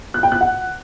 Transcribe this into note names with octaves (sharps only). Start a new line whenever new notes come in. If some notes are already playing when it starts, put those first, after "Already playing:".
F#6
G5
F#6
F#5